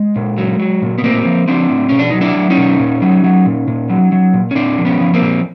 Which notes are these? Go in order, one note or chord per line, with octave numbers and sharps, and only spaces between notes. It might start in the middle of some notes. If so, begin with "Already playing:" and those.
Already playing: G#3
A#2
F#3
F#3
A#2
B3
A2 A#3 C4
F3
F3 C4 D4
A2
B2 C#4
D4
F#3 D#4
D4 E4
F#3
C#4 D#4
B2
A#2
F#3
F#3
A#2
A#2
F#3
F#3
A#2
C#4
A#2 C4 D4
F3
B3 C#4
F3
A#3 C4
A#2